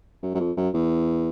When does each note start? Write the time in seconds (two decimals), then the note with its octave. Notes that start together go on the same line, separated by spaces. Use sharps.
0.22 F#2
0.34 F#2
0.40 F2
0.57 F#2
0.74 E2